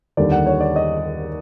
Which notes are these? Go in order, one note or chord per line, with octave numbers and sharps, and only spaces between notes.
D#2 D3 G3 D5
F#5
C#5
D5
D#5